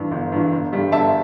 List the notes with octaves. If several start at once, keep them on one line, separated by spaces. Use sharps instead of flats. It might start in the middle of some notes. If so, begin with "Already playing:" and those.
Already playing: G2 E3
G1
G2 E3
G1
G2 G3
G1 E5 A5